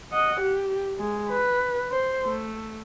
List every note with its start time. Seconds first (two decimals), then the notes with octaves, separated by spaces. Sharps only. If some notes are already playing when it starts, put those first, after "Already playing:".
0.12 D#5 F#5
0.41 G4
0.98 G#3
1.30 B4
1.91 C5
2.24 A3